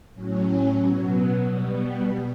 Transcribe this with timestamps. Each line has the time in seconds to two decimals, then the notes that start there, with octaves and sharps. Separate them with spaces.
0.14 A2 F#3 C#4
0.81 B2 F#3 B3
1.48 B2 G3 B3